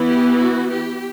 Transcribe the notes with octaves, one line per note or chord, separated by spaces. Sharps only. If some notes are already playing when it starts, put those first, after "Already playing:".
Already playing: E3 B3 E4
G4
F#4
G4